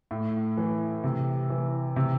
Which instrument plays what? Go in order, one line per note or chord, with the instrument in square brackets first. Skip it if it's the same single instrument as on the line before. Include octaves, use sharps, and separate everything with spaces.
[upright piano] A2
E3
C3
E3
C3